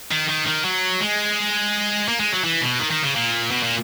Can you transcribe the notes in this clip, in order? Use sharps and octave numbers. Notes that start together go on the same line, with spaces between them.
D#3
D#3
D#3
F#3
G#3
A#3
G#3
F#3
E3
B2
D#3
D#3
C#3
A#2
B2
A#2